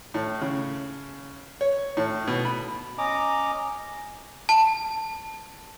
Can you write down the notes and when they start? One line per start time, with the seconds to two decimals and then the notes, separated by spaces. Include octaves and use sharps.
0.14 A2
0.41 C#3
1.61 C#5
1.97 A2
2.27 B2
2.45 B5
2.98 C#4 D#5 A#5 D6
4.49 A5